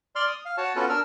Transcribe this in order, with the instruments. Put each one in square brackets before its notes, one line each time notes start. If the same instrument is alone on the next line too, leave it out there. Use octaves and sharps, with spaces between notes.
[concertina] D5 C6 F6
D#6
F5
F#4 C#5 A5
B3 C#4 F4 F#4 A4
D4 A#4 E6 F6